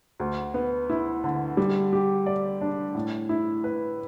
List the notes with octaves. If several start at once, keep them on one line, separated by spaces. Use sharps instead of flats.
D2
B3
E4
D3
G3
G4
D5
D4
A2
E4
B4